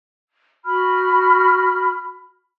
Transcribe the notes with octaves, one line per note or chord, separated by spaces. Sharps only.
F#4 B5 F6